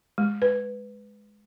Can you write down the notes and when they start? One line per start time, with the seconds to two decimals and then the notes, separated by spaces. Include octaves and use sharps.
0.18 G#3
0.42 B4